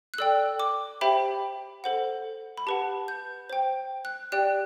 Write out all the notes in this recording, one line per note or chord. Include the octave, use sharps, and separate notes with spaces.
F#6
A4 D5 G5 E6
D6
G4 C5 E5 G5 B5
A4 C5 F#5
B5
G4 B4 F#5 A5
G6
C5 G5
F#6
G4 D5 G5 F#6